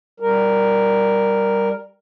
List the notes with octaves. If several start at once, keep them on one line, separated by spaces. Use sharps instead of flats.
G3 A#4